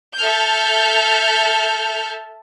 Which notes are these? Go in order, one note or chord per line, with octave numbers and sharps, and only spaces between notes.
A4 E5 A5 F6 G6